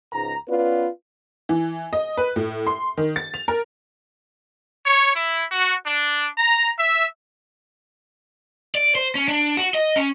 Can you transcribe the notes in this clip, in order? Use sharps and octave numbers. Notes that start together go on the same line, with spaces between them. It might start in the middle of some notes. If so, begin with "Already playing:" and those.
C#2 G#2 A#5
B3 C#4 F4 B4 D5
E3
D#5
B4
A2
C6
D#3
A6
F7
A#4
C#5
E4
F#4
D4
A#5
E5
D5
C5
C#4
D4
F#4
D#5
C#4